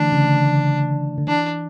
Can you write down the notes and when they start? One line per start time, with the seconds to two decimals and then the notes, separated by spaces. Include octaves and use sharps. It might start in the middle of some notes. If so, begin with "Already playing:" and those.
Already playing: D3 E3 A3 D4
0.12 C#3
1.18 D3
1.27 E3 D4